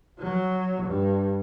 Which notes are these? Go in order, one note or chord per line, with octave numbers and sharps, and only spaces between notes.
F#3
G2